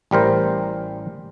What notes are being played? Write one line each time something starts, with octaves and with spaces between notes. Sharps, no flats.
A1 G3 A#4 C5